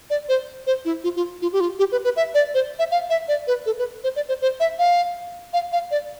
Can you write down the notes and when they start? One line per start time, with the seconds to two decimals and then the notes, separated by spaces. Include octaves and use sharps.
0.10 D5
0.29 C5
0.67 C5
0.85 E4
1.04 F4
1.16 F4
1.42 F4
1.53 G4
1.60 F4
1.79 G4
1.92 B4
2.04 B4
2.16 E5
2.34 D5
2.54 C5
2.79 E5
2.91 F5
3.10 E5
3.28 D5
3.47 B4
3.66 A4
3.79 B4
4.04 C5
4.16 D5
4.28 C5
4.42 C5
4.60 E5
4.79 F5
5.53 F5
5.72 F5
5.91 D5